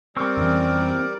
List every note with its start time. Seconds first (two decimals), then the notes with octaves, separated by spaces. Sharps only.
0.17 G3 C4 A#4 D5 C#6 E6
0.37 F2 E3 C#4